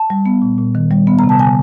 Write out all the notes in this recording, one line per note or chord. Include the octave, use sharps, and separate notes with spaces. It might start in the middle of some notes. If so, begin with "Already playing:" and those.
Already playing: A5
G3
B3
A#2
A#2
D#3
G3
B3
C3 A#5
A5
D3 G#5